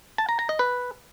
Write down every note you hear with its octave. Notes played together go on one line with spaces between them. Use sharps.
A5
A#5
A#5
D#5
B4